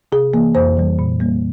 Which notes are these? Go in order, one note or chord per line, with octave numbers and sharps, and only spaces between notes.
C3 G#4
E3 A#3
F2 C5
E3 G3
A#2
G3 A#3